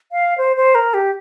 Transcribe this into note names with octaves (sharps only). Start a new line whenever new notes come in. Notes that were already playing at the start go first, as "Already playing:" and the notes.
F5
C5
C5
A#4
G4